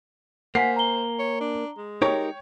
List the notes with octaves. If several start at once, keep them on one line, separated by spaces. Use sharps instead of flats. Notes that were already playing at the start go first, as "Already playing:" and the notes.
A#3 C5 F#5 G#5 B6 C7
A#5 G7
C#5
D4
G#3
D#4 G4 A#4 C#5 G5 C#6